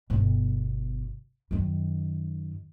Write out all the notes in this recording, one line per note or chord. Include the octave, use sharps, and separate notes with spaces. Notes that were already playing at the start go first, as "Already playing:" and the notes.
G1 B2
F#2 D#3